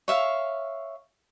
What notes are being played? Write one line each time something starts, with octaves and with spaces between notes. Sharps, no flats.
C#5 E5 F5